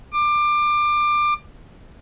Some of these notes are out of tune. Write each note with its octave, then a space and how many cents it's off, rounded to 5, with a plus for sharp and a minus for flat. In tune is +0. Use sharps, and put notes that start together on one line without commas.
D6 +25